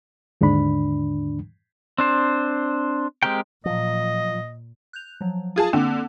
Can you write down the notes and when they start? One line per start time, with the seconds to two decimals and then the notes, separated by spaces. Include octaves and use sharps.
0.41 D#2 G#2 D3 D4 B5
1.98 C4 D4 C5
3.23 G#3 C4 G4 A#4 G5
3.65 A#2 F3 F#3 D#5
4.93 F#6 G6 F7
5.21 F3 F#3
5.56 F4 G#4 A5 D#6
5.73 D3 A#3 C4 D6